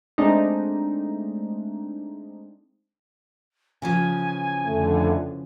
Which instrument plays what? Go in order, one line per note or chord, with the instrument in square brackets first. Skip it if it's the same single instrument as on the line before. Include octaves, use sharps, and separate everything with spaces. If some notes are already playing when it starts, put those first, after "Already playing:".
[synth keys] G#3 A3 C4 D4 D#4
[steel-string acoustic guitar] C#3 E3 F3 [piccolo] G#5
[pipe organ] F2 D3 [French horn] A3